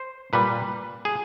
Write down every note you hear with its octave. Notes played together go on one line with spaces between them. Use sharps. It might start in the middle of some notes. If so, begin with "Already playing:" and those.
Already playing: C5
A#2 G3 B4
G#4